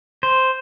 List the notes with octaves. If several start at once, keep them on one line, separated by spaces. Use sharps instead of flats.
C5